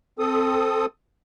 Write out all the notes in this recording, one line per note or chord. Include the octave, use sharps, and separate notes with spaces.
C4 A4 D#6